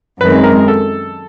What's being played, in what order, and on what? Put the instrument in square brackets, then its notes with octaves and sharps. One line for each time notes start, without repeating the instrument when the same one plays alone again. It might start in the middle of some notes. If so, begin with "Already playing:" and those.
[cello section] F#2 D#3 G#3 C4 [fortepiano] B4
[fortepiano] A#4
A4